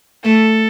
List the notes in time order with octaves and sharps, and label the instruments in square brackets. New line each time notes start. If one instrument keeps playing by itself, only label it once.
[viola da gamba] A3 [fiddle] A4